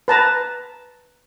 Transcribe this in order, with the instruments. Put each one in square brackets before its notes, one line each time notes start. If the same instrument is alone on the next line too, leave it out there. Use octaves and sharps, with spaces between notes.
[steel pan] B4 A5 A#5